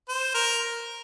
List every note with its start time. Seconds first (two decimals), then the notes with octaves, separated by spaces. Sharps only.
0.09 C5
0.34 A#4